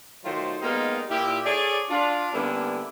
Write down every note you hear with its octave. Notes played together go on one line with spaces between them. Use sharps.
D#3 F#3 A3 F4 C5
G3 G#3 A#3 B3 D#4 F4
A#2 E4 G4
G#4 A4 C#5 D5
D4 F4
D3 G3 A#3 B3 C#4 E4